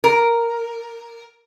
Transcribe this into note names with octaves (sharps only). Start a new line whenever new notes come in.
A#4